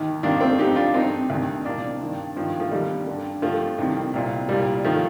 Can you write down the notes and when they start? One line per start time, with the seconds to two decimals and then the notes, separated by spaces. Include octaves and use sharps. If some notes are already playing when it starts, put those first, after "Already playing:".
Already playing: D#2 D#3
0.23 F2 C3 D#3 A#3 D4
0.41 A3 C4
0.58 F2 D3 D#4 G4
0.76 D4 F4
0.94 G2 D3 C4 D#4
1.30 D2 C3 D#3
1.65 C2 A#2 A#3 D4
2.01 G2 D#3
2.36 G2 D#3 F3
2.60 F3 A3
2.71 D#2 D3 G3 A#3
3.07 G2 D3
3.42 G2 D3 F3 A3
3.78 C2 C3 D#3
4.13 C2 A#2
4.49 C2 A#2 G3
4.84 D#3 F3 A3